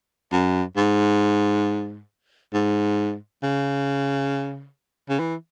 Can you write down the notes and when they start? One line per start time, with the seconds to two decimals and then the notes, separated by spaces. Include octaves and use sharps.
0.32 F#2
0.77 G#2
2.53 G#2
3.43 C#3
5.09 C#3
5.19 E3